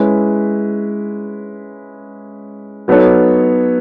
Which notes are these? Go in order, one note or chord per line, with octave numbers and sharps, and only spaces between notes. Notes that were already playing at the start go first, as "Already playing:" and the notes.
Already playing: G#3 C#4 E4 B4
F#3 B3 D#4 A4 C#5